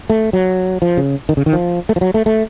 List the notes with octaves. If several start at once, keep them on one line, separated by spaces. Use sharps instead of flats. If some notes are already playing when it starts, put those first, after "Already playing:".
A3
F#3
F3
C#3
D#3
C#3
D#3
F3
A3
F3
F#3
A3
A3